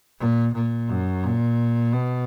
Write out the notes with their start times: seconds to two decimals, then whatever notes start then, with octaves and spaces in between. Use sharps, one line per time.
0.19 A#2
0.54 A#2
0.89 F#2
1.24 A#2
1.93 B2